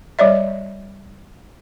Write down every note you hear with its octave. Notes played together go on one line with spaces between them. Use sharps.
G3 C#5 D5 E5